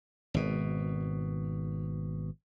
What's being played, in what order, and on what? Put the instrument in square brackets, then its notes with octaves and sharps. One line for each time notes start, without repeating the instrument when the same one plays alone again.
[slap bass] G#1 B2